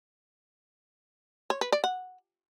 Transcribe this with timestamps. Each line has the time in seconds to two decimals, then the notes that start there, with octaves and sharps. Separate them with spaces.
1.50 C#5
1.61 B4
1.72 D5
1.84 F#5